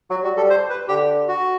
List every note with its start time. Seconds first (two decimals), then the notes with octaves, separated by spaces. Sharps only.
0.11 F#3 F#4
0.24 G3 F#4
0.37 G3 A4
0.50 C5
0.70 B4
0.88 D3 G4
1.28 F#4